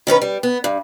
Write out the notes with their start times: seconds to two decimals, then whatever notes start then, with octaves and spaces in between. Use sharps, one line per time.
0.07 D#3 C#4 A4 B4
0.22 G3
0.43 B3
0.64 G2